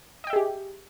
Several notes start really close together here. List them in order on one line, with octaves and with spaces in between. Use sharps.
D#5 G5 E5 G#4 G4